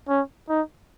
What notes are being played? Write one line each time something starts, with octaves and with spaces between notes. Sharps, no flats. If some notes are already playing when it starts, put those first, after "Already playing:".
C#4
D#4